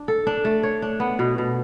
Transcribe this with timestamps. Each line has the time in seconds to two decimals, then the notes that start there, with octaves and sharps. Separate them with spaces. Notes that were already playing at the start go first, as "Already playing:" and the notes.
Already playing: D4
0.08 A4
0.27 D4
0.45 A3
0.63 C#5
0.82 D4
1.00 B3
1.19 B2
1.38 B2